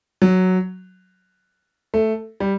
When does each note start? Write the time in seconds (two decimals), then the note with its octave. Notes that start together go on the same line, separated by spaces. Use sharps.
0.22 F#3
1.94 A3
2.40 G3